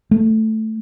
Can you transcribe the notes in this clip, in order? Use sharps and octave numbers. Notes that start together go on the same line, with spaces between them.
A3